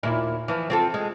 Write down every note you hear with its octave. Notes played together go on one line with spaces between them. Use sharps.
D#2 A#2 E4
E3 F3
C4 F4 A4
G#3 C4